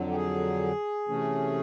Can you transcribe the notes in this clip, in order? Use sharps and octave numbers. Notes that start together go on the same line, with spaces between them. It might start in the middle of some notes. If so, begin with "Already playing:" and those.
Already playing: F2 D3 F#3
G4
G#4
C3 E3 A3 C#4